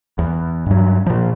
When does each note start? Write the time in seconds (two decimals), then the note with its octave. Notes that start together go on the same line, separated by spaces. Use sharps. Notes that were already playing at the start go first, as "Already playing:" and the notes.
0.19 E2
0.66 G2 F#3
1.06 A#2 F3